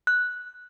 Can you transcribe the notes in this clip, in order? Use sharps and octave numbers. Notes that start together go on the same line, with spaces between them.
F#6